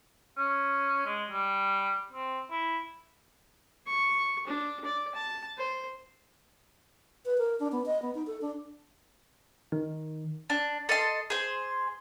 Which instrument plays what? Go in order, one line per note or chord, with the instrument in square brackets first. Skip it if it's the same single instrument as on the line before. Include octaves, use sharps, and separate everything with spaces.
[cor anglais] C#4
G#3
G3
C4
E4
[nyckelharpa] C#6
D4
D5
A5
C5
[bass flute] B4
A#4
D4
B3
D#5
B3
D#4
A4
D4
[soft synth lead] D#3
[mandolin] D4
A4 D#5 C6
G#4 C5